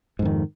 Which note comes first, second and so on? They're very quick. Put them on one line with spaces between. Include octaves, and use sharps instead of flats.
G#2 F2 D#3